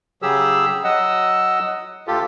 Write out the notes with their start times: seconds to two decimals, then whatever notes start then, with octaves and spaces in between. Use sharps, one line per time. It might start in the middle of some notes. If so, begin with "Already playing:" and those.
0.22 C#3 F#3 G4 G#4 E6
0.84 F#3 D#5 F#5 E6
2.07 D2 F4 G4 A4